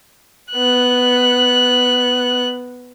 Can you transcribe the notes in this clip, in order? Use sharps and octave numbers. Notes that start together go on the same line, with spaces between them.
B3 F#6